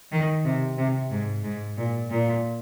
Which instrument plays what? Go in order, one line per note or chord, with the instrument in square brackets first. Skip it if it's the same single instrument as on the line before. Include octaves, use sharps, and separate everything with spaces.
[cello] D#3
C3
C3
G#2
G#2
A#2
A#2